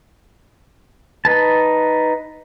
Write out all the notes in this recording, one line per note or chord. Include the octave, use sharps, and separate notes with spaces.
D#4 B4 A5